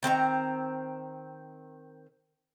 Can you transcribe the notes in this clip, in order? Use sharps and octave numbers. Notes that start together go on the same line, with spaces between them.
D#3 C4 B4 A#5